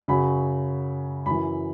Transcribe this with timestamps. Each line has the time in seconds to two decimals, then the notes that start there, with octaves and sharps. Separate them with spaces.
0.08 F#2 C#3 F#3 B5
1.26 F#2 E3 B5